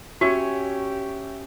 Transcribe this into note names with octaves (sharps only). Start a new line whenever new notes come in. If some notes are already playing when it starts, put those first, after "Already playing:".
C#4 F#4 G4 E5 C#6 G#6